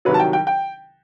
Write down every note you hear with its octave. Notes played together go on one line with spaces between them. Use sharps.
C2 C3 D#3 F#3 B4
A5
G5
G5
G5